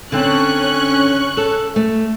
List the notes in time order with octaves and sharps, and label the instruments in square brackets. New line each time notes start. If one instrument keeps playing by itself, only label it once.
[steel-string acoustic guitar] D3 C4 A5 [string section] C#4 C#6 F#6
[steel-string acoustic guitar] A4
A3